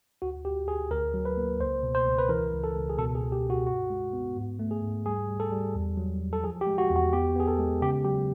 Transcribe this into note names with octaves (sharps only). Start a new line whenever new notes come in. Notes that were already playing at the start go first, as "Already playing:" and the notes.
D2 F#4
D2 G4
D2 G#4
D2 A#4
F#3
B4
A#3
C#2 C5
B2
C5
C#2
B4
E3 A#4
C#2
A4
C#2
G#4
B2 A4
G#4
B2
G4
B2
F#4
G2 F#4
G#3
B3
G#2
A3
G#4
G#2
G3 G#4
G3
A4
G3
E2
F#3
F#3
A4
F3 G#4
G4
G#3
F#4
E2
F#4
B3 G4
B3 G#4
A4
G#3
C#3 G4
F#3 G4